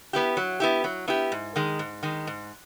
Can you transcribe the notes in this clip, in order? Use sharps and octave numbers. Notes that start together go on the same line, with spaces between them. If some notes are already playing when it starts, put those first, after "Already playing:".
B3 E4 G4
F#3
B3 E4 G4
F#3
B3 E4 G4
G#2
D#3 G#3
G#2
D#3 G#3
G#2